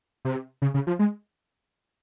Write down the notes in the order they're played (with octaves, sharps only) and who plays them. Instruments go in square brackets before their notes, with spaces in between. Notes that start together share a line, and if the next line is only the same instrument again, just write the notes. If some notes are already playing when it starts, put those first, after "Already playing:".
[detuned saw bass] C3
C#3
C#3
F3
G#3